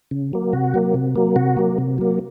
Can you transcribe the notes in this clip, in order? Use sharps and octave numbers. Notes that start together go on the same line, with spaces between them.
C#3
F#3 A#3
C3 F#4
F#3 A#3
C3
F#3 A#3
C3 F#4
F#3 A#3
C3
F#3 A#3